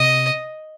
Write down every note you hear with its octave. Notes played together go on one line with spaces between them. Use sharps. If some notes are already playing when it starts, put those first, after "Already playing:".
Already playing: C3 D#5